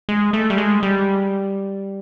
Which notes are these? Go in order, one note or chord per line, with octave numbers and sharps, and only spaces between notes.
G#3
A3
G3
G#3
G3